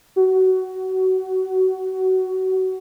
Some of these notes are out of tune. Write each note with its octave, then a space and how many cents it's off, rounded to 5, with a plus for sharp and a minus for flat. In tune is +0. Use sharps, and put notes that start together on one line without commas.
F#4 +20